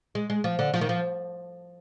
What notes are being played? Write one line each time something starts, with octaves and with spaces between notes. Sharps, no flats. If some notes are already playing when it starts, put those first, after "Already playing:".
G#3
G#3
F3
D3
F3
D#3
F3